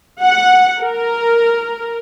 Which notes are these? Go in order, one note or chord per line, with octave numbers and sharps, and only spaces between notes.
F#5
A#4